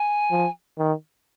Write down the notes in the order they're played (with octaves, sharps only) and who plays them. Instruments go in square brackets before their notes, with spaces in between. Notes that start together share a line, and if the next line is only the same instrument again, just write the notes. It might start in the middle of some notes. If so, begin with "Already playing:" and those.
Already playing: [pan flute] G#5
[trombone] F3
D#3